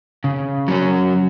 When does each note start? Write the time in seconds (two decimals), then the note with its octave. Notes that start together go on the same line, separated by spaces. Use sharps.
0.24 C#3
0.68 F#3 C#4